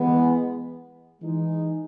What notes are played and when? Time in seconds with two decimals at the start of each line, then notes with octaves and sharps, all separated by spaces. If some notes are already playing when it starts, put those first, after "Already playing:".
Already playing: E3 G#3 B3
1.21 E3 G#3 D#4